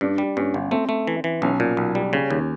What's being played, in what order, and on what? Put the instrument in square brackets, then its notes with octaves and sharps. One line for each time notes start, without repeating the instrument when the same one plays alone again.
[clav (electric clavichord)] G2 [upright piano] D4
[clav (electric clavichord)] G3
[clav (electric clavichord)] G2 [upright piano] C#4
[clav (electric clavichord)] G1
[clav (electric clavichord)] A3 [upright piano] C4
[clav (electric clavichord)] A3
E3
E3
[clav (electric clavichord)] B1 [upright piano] C#4
[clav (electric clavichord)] A#2
B1
G3
[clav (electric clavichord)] C#3 [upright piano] C#4
[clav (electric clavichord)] D#2